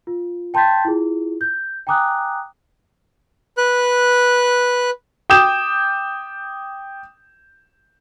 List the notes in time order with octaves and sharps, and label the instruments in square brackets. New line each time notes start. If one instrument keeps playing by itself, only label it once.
[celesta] F4
G5 A5 C6 G6 A6 B6
E4 F4 G#4
G6
G5 G#5 A#5 D6 D#6 F#6
[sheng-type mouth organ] B4 F#6
[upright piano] G5 D6 D#6 G6 E7